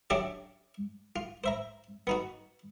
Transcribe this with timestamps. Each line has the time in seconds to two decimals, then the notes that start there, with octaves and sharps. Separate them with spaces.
0.10 F#3 C#4 D4 G4 D5 E5
1.16 F4
1.44 C5 E5 A#5
2.07 B3 D#4 F#4